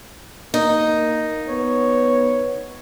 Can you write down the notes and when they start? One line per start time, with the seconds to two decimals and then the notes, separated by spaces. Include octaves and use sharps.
0.54 A#3 D#4
1.48 B3 C#5